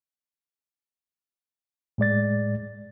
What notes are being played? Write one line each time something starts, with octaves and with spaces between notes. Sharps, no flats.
A2 G#3 D5 A6